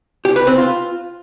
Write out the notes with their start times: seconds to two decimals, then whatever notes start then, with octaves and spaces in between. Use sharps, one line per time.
0.25 G4
0.36 B4
0.47 C4
0.58 F4